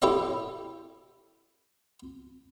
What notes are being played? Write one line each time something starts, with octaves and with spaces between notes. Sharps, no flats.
E4 G4 A4 C#5 D#5